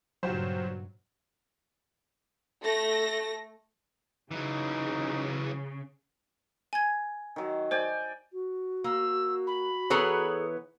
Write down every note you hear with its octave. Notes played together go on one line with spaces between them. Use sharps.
G2 A#2 C#3 F#3 F4 G4 C5
A3 A#6
C#3 E3 F#3 D#4
G#5 G#6
D#3 F#3
C5 D5 G5 G#5
F#4
A#3 E6
B5
E3 B3 G#4 A4 C#5 A#5